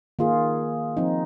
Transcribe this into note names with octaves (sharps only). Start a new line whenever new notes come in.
D#3 A#3 F4 G#4
F3 C4 D#4